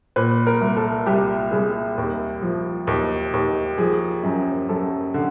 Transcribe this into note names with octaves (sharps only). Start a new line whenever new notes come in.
A#2 B4
A#4
C2
A4
C2 G4
C2 G#4
D#2
F3
D#2
D#2
F3 G#4
F#2
F#2 A4
D3